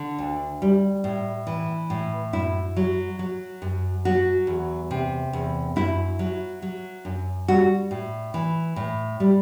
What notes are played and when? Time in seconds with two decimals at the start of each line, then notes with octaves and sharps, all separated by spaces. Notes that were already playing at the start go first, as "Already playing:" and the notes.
Already playing: D3
0.18 D2
0.62 G3
1.04 A2
1.47 E3
1.90 A2
2.33 F#2 E4
2.77 F#3
3.19 F#3
3.62 F#2
4.05 F#3 F#4
4.47 E2
4.91 C3
5.33 E2
5.76 F#2 E4
6.19 F#3
6.62 F#3
7.05 F#2
7.48 G3 F#4
7.91 A2
8.34 E3
8.76 A2
9.20 G3